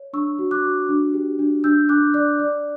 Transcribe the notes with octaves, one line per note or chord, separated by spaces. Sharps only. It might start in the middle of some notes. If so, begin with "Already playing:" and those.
Already playing: C#5
D4 C#6 E6
F#4
D6 F#6
F#4
D4
G4
D4
D4 E6 G6
D4 D6 F#6
D5 D6 F#6
D5